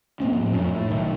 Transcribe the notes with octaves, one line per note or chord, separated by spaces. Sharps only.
A2 A#3 C4 C#4
A2 F3
F2 D4
A2
B1 D#3